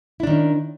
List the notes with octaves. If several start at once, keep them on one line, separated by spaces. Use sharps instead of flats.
D#3 C#4 D4 E4